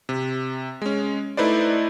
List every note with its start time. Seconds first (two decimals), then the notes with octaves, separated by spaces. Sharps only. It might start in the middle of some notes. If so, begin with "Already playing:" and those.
0.09 C3
0.82 G#3 C#4
1.37 A3 D#4 E4 B4 C5 D5